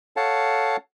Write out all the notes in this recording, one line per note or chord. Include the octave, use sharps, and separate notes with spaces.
A4 C#5 F5 F#5 A5